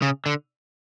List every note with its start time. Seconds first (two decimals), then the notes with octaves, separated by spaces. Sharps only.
0.02 C#3
0.26 D3